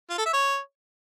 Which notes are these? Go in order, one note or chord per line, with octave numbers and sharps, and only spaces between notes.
F4
A4
E5
C#5